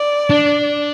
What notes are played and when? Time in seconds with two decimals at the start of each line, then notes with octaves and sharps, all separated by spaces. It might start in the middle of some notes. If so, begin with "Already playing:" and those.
Already playing: D5
0.30 D4